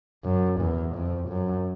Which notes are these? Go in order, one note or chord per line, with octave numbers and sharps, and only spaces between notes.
F#2
E2
F2
F#2